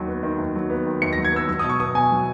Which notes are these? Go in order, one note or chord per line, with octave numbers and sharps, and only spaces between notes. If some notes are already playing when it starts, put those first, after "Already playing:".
Already playing: D#2 D#3 F#3
B3
D#3
D#2
F#3
B3
D#3
D#2 C#7
A#6
F#3
G#6
B3 E6
F#3 E6
B2 D#6
C#6
B3 D#6
B2 G#5
F#3